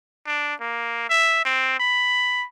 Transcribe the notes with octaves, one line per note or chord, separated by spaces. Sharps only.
D4
A#3
E5
C4
B5